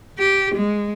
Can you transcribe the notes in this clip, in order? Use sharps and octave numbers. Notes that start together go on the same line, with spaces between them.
G4
G#3